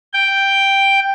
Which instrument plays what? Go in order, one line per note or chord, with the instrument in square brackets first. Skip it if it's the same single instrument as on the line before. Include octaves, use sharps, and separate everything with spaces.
[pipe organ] G5